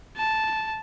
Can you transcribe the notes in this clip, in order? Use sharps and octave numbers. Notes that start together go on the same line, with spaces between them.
A5